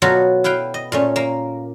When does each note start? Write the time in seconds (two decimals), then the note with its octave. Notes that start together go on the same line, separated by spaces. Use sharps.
0.02 B2 F#3 B3 F4 F#4 A4
0.44 E4 B4 F5 G5
0.74 D#5
0.92 A#2 A3 C#4
1.16 A#3